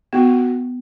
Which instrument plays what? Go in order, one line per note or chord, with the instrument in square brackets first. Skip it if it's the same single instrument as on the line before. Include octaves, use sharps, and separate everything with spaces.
[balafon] B3 [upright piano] F#4